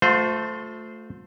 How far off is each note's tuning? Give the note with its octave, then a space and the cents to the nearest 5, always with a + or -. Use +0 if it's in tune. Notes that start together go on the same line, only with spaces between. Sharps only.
A3 +0 F4 +40 C5 -10